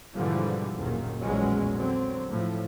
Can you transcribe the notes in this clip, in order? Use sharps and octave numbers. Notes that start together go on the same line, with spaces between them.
G#2 B2 D3 E3 F3 G3
F#1 D#2 A#2 D#3
A#1 E2 A2 F#3 G#3 C#4
D3 F#3 C4
A2 F3